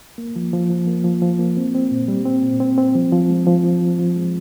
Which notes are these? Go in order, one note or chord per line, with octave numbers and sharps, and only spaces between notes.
A#3
F3
F3
F3
A#3
F3
F3
A#3
C4
C4
A#2
G3
C4
A#2
C4
C4
F3
F3
G#3
F3
F3
F3
F3
G#3